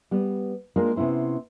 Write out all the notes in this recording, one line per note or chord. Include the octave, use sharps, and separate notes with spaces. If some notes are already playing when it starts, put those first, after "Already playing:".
G3 B3
G#3 A#3 D4 F4 A#4
C3 B3 C#4 E4 C5